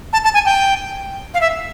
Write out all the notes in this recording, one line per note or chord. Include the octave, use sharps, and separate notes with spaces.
A5
A5
G#5
G5
F5
E5